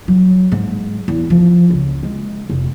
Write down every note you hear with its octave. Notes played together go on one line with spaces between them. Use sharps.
F#3
G#2
E2
F3
C#2
G#3
F1